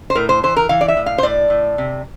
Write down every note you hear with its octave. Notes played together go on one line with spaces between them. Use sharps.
C5
A2 A#4
C5
E3 C5
A#4
E3 F5
D5
E5
A2
F5
C5
A2 D5
A2
C3